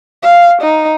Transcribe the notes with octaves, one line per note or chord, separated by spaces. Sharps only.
F5
D#4